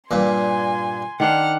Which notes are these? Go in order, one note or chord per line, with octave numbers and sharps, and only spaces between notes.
G2 A#2 G#5 C6
D#3 D4 C5 F#5 F6